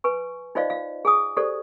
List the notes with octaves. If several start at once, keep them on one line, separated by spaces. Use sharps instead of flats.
B4 G#5 C#6
D#4 F4 C5 D5 D#5 F5
F4 F5
G#4 G#5 D#6
G4 A4 C5 D5